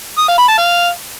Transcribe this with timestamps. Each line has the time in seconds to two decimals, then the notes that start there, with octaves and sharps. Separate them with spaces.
0.18 D#6
0.28 F5
0.38 B5
0.48 A5
0.58 F5